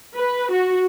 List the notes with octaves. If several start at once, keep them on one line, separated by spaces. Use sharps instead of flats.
B4
F#4